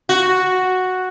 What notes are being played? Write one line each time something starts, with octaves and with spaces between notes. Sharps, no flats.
F#4